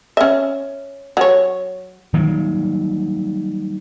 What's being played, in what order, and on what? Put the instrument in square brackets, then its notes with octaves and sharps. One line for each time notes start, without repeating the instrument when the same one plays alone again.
[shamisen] C#4 E5
F#3 C#5
[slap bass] D#3 F#3 G3 A#3